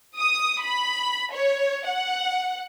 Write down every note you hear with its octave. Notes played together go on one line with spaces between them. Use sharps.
D#6
B5
C#5
F#5